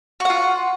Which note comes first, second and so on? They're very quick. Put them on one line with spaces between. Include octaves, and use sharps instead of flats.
F#4 F#5 F4